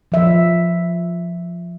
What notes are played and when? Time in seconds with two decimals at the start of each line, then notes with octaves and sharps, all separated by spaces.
0.12 F3 E5